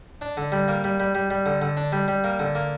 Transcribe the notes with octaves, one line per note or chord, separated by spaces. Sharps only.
D4
D3
G3
A#3
G3
G3
G3
G3
D3
D3
D4
G3
G3
A#3
D3
A#3